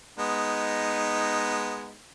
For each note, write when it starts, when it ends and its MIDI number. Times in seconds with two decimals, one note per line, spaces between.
0.18 1.96 56
0.18 1.96 59
0.18 1.96 63